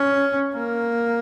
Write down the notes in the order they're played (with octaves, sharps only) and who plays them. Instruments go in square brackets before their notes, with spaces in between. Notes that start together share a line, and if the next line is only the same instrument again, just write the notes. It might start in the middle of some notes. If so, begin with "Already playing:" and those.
Already playing: [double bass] C#4
A#3